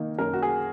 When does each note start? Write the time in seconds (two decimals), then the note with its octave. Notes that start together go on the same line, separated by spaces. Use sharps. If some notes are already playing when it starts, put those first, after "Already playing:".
Already playing: D#3 A#3 D#4
0.19 F#2 A#4
0.33 F#4
0.42 G#4